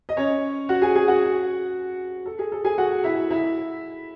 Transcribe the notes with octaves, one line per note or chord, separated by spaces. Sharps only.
D#5
C#4 C#5
F#4 F#5
G#4 G#5
G#4 G#5
F#4 F#5
A4
G#4
A4
G#4 G#5
F#4 F#5
E4 E5
E4 E5